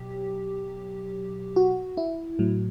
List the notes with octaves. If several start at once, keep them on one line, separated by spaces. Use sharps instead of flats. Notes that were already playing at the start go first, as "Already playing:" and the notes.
Already playing: B2 F#3 G4
F#4
E4
A2 F#3